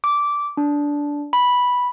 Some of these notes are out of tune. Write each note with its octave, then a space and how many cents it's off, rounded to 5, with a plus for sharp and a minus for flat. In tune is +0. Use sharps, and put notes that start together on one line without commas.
D6 -10
D4 -15
B5 -5